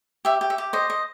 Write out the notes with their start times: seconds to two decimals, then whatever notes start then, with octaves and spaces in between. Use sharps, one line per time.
0.25 G4 E5
0.41 G4
0.50 E5
0.58 G4
0.73 C5 D#5
0.90 D#5